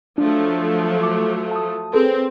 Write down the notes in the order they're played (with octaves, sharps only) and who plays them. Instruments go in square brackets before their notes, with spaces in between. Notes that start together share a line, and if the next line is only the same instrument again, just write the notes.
[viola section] F3 F#3 A3 [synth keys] D4
[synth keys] D6
A5 D#6
[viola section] C4 [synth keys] G#4 A4 B4